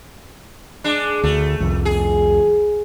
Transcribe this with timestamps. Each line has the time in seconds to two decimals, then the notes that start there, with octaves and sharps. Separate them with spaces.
0.84 G#3 D4
1.23 D2 A3
1.60 C2 F2
1.85 G#4